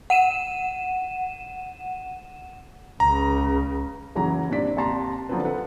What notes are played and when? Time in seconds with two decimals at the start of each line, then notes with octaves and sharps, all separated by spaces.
0.10 F#5 D#7 E7
3.00 C#2 C#3 A#5
4.15 F#1 C#3 E3 F#3 A#5
4.49 G2 A#2 C4 D4 D5 B6
4.77 D#2 C3 A5 A#5 C6
5.29 D3 F3 F#3 A#3 C4 B4
5.45 F4 A4 B4 F#5